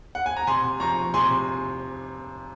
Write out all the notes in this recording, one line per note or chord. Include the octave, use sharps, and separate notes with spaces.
F#5
G#5
A#5
C3 G#5 C6
F3 A#5 C#6
C3 G#5 C6